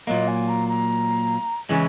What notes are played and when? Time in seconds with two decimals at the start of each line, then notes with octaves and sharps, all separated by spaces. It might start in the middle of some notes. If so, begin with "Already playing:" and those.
0.07 A#2 F#3 A#3 D#5
0.27 G#5
0.48 A#5
0.68 A#5
1.69 C#3 E3 G#3 G#5